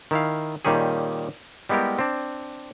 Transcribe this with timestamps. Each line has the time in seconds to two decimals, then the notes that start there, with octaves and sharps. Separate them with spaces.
0.11 D#3 E4 F5
0.65 A#2 D#3 G3 C#4 G#4
1.69 G3 G#3 B3 E4 G4 A#4
1.99 C4 D4